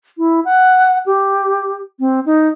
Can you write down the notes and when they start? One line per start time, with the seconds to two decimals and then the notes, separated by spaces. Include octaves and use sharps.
0.18 E4
0.45 F#5
1.06 G4
2.00 C4
2.26 D#4